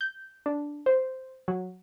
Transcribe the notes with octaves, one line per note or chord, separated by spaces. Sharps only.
G6
D4
C5
F#3